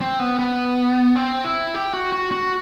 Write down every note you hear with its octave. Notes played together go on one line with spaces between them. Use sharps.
C4
B3
B3
C4
E4
G4
F#4
F#4
F#4